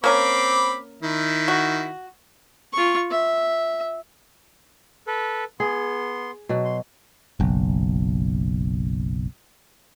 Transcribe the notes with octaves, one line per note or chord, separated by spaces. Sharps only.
A#3 C4 C#4 A#4 B5 D6
D#3 E4
F#4
F4 C#6
E5
A4 B4
B3 G#4 C6
B2 F#3
C6
F#1 B1